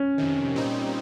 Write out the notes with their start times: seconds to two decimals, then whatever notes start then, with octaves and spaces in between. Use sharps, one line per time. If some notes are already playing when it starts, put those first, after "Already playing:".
Already playing: C#4
0.18 F2 C3 D#3
0.55 A#2 G3 C4 D#4